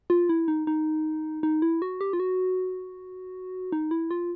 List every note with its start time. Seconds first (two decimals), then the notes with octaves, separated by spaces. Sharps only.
0.10 F4
0.29 E4
0.48 D#4
0.67 D#4
1.43 D#4
1.62 E4
1.82 F#4
2.01 G4
2.13 F4
2.20 F#4
3.72 D#4
3.91 E4
4.11 F4